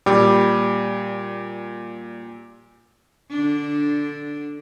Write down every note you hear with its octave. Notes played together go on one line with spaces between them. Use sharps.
A#2 G3 G4
D3 D4